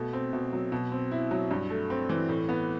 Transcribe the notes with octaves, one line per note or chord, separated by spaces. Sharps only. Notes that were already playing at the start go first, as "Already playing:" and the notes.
Already playing: B2 A3
C4
B2
F#3
B2
C4
E4
F#3
G2
A3
C4
E3
A2
B3